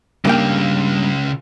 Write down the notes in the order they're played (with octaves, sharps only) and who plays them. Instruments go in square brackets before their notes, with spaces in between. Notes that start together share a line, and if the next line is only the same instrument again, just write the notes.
[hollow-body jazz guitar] G2 A#3 G5 [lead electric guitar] C#3 F4